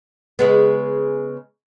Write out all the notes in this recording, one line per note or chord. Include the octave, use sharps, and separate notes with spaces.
C#3 G#3 B3